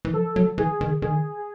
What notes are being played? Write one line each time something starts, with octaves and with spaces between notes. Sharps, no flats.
E3
F3 A4
F#3
E3 G#4
D#3
D#3 G#4